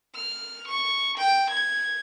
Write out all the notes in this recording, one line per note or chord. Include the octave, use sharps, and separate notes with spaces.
F6
C#6
G5
G#6